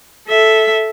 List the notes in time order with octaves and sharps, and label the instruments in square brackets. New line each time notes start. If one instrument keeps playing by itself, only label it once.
[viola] A4 E5